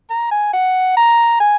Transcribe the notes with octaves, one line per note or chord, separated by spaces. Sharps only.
A#5
G#5
F#5
A#5
G#5